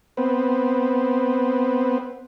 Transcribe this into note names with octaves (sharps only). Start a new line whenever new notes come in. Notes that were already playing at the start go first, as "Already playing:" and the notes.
B3 C4